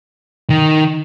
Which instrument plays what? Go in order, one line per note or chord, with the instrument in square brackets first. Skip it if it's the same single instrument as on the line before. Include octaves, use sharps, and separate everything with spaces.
[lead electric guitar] D#3